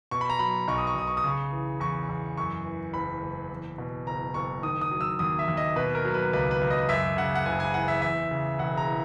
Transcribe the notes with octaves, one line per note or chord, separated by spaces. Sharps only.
B2 C#6
B5
A#5
F#3 B5
B1 C#6
D#6
C#6
B1 D#6
C#6
D#6
C#3 C#6
E3
E2 C#6
E2
F#2 C#6
E3
F#1 B5
F#1
E2
B2
F#1 A#5
F#1 C#6
D#3 D#6
D#6
F#3
E6
D#2 D#6
E5
D#2
D#5
B2 B4
A#4
F#3
B4
C#2 B4
B4
C#2
D#5
F#2 E5
C#3 F#5
F#5
F#1 G#5
G#5
E3 F#5
E5
E2 E5
C#3
E1 F#5
A#5
E3